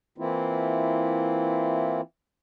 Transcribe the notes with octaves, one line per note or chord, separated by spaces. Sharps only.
E3 A#3 C4 E4 F4